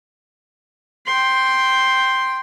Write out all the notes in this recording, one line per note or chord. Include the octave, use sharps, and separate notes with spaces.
G5 C6